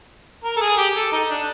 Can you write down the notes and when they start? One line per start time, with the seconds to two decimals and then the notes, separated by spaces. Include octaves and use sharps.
0.44 A#4
0.56 A4
0.61 G#4
0.77 G4
0.95 A4
1.12 D#4
1.30 D4